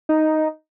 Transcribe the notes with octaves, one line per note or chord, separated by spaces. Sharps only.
D#4